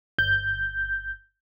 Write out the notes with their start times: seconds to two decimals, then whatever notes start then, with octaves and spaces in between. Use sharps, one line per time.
0.18 G1 G6